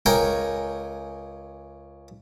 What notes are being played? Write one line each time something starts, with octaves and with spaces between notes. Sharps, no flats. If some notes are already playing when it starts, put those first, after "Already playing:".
C#2 A#4 C#5 G5 G#5 A#5